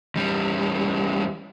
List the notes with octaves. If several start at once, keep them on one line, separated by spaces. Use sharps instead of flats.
E2 G3